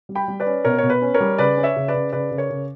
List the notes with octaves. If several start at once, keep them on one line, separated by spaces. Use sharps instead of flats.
G3
G5 B5
G3
B4 D5
C#4
B2 A#4 C#5
B2 C#5
B4
C#4
A#4 C#5
G3
C#3 B4 D5
C#4
C#5 E5
C#3
B4 D5
C#3
C#3 B4 D5
C#3
A#4 C#5
C#3